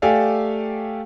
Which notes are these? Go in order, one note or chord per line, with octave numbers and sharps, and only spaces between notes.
A3 G4 A4 D5 F5 G#5